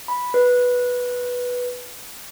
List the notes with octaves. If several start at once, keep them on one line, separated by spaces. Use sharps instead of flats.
B5
B4